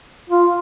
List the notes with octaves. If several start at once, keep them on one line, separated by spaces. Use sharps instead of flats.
F4